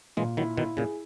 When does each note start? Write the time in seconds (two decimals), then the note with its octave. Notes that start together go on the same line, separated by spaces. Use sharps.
0.17 A#2 E3 G#3
0.37 D#3 F#3 E4
0.57 B2 D#3 E4
0.77 A#2 C#3 G#4